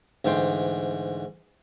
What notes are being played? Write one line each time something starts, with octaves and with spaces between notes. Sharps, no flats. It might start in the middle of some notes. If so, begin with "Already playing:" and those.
D2 G#2 E3 G5 C6